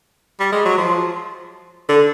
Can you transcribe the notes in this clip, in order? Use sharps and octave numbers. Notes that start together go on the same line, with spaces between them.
G3
G#3
F#3
F3
D3